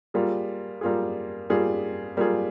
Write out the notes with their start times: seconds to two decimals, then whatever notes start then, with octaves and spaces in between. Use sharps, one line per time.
0.14 G3 A#3 F4 G#4
0.81 G3 A#3 F4 G#4
1.50 G3 A#3 F4 G#4
2.17 G3 A#3 F4 G#4